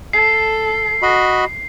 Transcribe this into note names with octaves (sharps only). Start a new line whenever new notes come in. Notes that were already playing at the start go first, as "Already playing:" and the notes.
A4 C7
F#4 D#5 B5